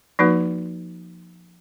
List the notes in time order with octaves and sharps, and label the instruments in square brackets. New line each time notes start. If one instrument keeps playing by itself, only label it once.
[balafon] F3 A#3 D#4 F#4 B4